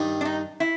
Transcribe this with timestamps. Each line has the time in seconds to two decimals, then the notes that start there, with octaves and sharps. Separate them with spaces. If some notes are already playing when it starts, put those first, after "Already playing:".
Already playing: G2 D#3 G3
0.21 D4
0.25 D#4
0.60 E4